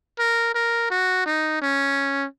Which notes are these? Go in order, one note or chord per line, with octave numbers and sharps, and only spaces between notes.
A#4
A#4
F#4
D#4
C#4